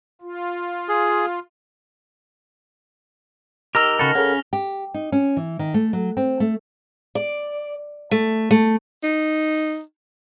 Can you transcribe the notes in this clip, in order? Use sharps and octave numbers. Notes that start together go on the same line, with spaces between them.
F4
G#4
D#3 G4 A#5 E6 F6 A#6 F7
C#3 F#4 A4 D#5 A5 B5
C#3 C#4 A4 A#4 F#5
G4
D#4
C#4
E3
D#3
A3
F#3
C4
A3
D5
A3
A3
D#4